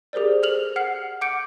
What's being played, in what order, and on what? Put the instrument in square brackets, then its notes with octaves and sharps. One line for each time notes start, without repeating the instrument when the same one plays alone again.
[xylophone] G4 G#4 A#4 C5 D5
A4 F6 F7 F#7
F#5 F6 C7
F#5 D6 G6 C#7 D7